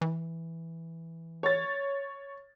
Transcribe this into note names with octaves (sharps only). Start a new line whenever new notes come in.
E3
C#5 A6